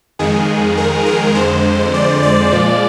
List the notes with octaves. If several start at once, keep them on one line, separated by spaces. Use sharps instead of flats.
F2 D#3 G#3 G#4
A#4
A#4
F2 D3 G#3 C5
D5
D5
A#2 F3 G#3